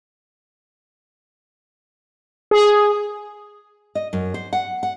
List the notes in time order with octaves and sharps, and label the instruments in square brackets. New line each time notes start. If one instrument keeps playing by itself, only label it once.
[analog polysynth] G#4
[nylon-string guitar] D#5
F#2
C5
F#5
F#5